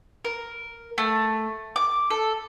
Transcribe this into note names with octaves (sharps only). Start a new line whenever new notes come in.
A#4
A3
D6
A4